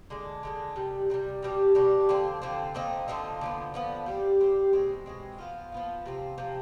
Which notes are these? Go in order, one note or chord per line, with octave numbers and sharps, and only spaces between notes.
D3 G#3 D4
D3 G#3 D4
C3 D#3 G3
C3 D#3 G3
B2 G3 D4 G4
B2 G3 D4 G4
D3 F3 C4
D3 F3 C4
D3 F3 C4 D#4
D3 F3 C4 D#4
D3 F3 B3
D3 F3 B3
G3 C4 G4
G3 C4 G4
B2 G#3 C4
B2 G#3 C4
F3 B3 F4
F3 B3 F4
C3 F3 C4
C3 F3 C4